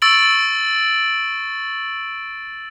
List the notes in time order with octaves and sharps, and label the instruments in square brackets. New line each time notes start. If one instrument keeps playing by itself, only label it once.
[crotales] C#6 E6 A6 D7 F#7